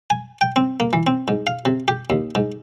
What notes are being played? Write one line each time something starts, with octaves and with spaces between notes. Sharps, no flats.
G#5
G5
C4
A#3
E3
C4
G#2
F5
C3
G4
D#2
G#2